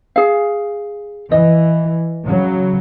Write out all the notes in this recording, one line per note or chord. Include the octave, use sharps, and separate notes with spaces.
G#4 F5
E3 D#5
C#3 F#3